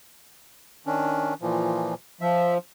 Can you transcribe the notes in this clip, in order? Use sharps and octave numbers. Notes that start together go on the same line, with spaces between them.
D#3 C#4 D4
A#2 E3 F3
F3 E5